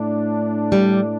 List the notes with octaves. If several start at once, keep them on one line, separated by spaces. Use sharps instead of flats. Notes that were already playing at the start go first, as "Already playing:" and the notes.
Already playing: A2 A3 D4
G3